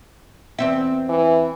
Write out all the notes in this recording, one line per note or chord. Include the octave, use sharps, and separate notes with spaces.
E2 C4 E5
E3